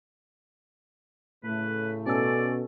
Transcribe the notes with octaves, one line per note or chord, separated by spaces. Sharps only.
A2 C#3 A3 B4
B2 C#4 A4 D5